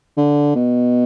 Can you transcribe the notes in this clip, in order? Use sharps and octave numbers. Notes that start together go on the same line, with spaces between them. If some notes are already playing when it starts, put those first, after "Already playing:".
D3
B2